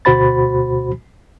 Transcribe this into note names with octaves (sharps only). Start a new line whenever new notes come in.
D2 B2 F#4 C5 B5 A6